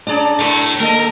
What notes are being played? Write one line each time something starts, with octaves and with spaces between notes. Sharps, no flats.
C#4 D4 G#4 D5 A5 A#5
A2 G#3
D3 D#3 A#3 A4 A#4 D#5